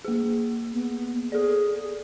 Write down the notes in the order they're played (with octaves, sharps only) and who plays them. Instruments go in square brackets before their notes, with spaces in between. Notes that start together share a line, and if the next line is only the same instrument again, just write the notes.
[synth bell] A#3 G#4
[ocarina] B3
[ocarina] G#4 [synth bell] A4 D5